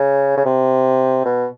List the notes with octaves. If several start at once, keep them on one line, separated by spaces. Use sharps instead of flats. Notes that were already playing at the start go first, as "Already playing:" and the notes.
Already playing: C#3
C#3
C3
B2